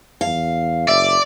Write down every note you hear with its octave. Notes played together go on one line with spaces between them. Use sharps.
E2 F5
F#1 D5 E5